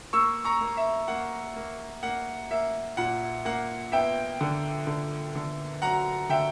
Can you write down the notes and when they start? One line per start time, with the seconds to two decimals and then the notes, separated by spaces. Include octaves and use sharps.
0.13 A#3 C#6 E6
0.45 A#5 C#6
0.61 A#3
0.77 E5
1.08 A#3 F#5
1.56 A#3
2.03 A#3 F#5
2.51 A#3 E5
2.97 A#2 F#5
3.45 A#3 F#5
3.92 B3 E5 G5
4.41 D3
4.87 D3
5.36 D3
5.82 F#3 F#5 A#5
6.29 D3 E5 G5